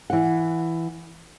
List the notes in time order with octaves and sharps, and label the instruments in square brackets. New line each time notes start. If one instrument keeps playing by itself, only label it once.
[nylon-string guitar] E3 F#5